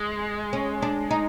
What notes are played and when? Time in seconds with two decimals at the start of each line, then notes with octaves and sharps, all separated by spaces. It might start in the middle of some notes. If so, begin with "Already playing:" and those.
Already playing: G#3
0.53 C#4
0.82 D4
1.11 D#4